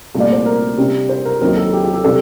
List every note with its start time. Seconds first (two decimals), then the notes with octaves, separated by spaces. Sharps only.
0.15 C2 A#2 A3
0.20 D5
0.32 C5
0.46 A#4
0.77 C3 G3 D4
1.09 C5
1.25 A#4
1.41 D#2 D#3 F#3 C4 D#4 A#4
1.57 A4
1.73 G4
1.84 G4
1.94 A4
2.04 C3 G3 D4 A4